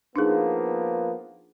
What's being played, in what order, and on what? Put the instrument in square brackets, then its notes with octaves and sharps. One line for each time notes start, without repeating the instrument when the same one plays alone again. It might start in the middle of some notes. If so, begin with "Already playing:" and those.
[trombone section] F3 A#3 B3 [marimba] D4 D#4 G#4